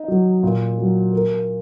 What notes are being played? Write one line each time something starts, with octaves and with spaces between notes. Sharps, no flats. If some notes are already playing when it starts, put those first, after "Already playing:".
Already playing: D#4
F#3
A#2
F#3
A#4